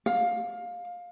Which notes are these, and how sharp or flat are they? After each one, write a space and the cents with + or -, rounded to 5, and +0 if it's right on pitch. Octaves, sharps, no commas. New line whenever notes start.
F5 +20